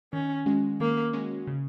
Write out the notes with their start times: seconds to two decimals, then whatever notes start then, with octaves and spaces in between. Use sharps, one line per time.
0.13 D#3 C#4
0.46 G#3 C#4 F#4
0.80 D#3 A#3
1.13 G#3 C#4 F#4
1.47 C#3